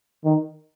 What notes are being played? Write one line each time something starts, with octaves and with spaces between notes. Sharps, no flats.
D#3